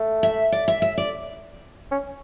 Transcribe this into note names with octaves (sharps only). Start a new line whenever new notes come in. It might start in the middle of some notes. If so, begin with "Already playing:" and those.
Already playing: A3
E5
D5
E5
E5
D5
C#4